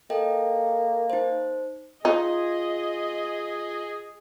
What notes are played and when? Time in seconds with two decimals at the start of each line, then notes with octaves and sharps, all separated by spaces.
0.10 A#3 A4 D#5 G5
1.10 D#4 C5
2.05 D#4 F4 G#4 D#5